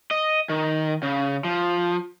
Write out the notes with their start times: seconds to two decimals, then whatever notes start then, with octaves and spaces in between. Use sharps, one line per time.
0.11 D#5
0.49 D#3
1.02 C#3
1.44 F3